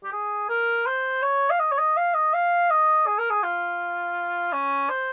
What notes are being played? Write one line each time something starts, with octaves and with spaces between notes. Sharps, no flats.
G4
G#4
A#4
C5
C#5
F5
D#5
C#5
D#5
F5
D#5
F5
D#5
G#4
A#4
G#4
F4
C#4
C5